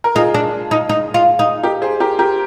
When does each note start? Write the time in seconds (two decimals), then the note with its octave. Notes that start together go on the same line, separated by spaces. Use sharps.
0.04 A#4
0.15 D#4 F4 G#4
0.34 D4
0.71 D#4
0.89 D#4
1.14 F4
1.39 D#4
1.63 G4 A#4
1.82 G#4 C5
2.00 G4 A#4
2.19 G4 A#4